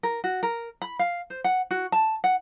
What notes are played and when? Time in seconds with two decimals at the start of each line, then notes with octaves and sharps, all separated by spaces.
0.03 A#4
0.24 F#4
0.43 A#4
0.82 B5
0.99 F5
1.30 C5
1.44 F#5
1.71 F#4
1.92 A5
2.24 F#5